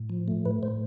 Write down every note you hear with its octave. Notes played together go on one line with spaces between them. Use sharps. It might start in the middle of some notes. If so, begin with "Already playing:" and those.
Already playing: A2
F3
A3
A2 B4
A2 C5